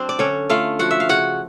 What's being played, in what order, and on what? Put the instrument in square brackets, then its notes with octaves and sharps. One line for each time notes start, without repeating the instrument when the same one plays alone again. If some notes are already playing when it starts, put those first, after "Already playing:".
Already playing: [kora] F#3 C4 D4 C5
D5
D3 C#4 C#5
A3 F4 F5
F3 F#4 F#5
E5
F5
C#3 F#4 F#5